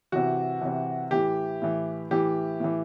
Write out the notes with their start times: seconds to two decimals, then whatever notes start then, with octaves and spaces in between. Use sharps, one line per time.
0.12 C3 E3 F#4
0.61 C3 E3
1.11 A2 E3 G4
1.62 A2 E3
2.11 A2 E3 G4
2.60 A2 E3